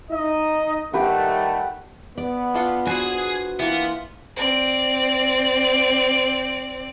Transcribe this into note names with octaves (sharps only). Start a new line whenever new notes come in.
D#4 D#5
D#3 G3 A3 G4 B4 F#5
B3 D5
D4 F4 F#5
F#4 G#4 B4 C5 G#5
E3 A#3 B3 F4
C4 D5